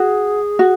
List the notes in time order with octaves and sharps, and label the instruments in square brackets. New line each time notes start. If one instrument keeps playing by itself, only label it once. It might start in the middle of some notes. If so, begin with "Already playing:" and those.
Already playing: [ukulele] F#4 [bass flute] G#4
[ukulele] F#4